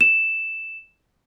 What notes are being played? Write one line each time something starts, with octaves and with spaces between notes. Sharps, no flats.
E7